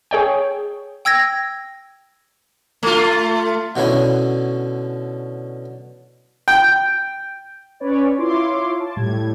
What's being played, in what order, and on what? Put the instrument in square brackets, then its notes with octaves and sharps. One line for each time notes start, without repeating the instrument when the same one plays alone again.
[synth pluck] G#4 C#5 G5
[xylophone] G5 E6 G#6 A#6
[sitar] A3 F4
[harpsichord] B2 D3 C#4 E4
[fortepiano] G5
[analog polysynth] C#4 B4 C#5 D5
E4 F4 C#5 C6 D6
A5
A2 G3 G#6